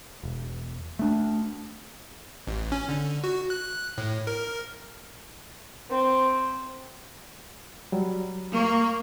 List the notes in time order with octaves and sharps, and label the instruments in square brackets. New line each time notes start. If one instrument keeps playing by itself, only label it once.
[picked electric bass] E1
A3 D4
[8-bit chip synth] A1
C#4
D3
F#4
F#6
A2
A#4
[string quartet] C4
[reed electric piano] F#3 G3
[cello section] A#3 [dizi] C#6